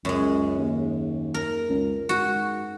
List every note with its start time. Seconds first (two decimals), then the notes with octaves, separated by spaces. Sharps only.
0.05 C#2 F#2 G#3
0.58 D#2
1.34 A#4
1.69 C#2
2.09 G#2 F#4